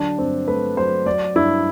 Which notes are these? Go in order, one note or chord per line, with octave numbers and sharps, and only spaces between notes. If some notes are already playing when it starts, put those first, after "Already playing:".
Already playing: D3 F#3 D4
G2 C4
A3 B4
F#3 C5
F#3 D5
G2 E4